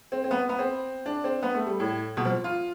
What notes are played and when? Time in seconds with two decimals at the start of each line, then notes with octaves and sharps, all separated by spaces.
0.12 C4
0.24 C4
0.31 B3
0.49 B3
0.59 C4
1.06 D4
1.24 C4
1.43 B3
1.54 A3
1.66 G3
1.80 A2
2.17 B2
2.25 F3
2.44 F4